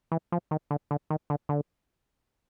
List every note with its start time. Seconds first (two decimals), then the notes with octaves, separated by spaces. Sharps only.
0.12 E3
0.32 F3
0.51 D#3
0.71 D3
0.91 D3
1.10 D#3
1.30 D3
1.49 D3